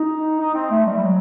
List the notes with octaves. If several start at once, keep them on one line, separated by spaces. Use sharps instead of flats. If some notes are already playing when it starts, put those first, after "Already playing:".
Already playing: D#4
D#4
C4
A3
G3
G3
F#3